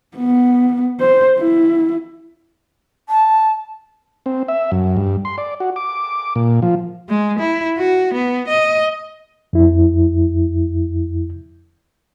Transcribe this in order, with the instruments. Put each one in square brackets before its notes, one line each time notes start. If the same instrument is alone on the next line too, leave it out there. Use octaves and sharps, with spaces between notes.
[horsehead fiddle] B3
C5
E4
[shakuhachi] A5
[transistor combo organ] C4
E5
F#2
G2
C6
D5
F#4
D6
A#2
F3
[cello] G#3
E4
F#4
B3
D#5
[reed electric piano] F2 E4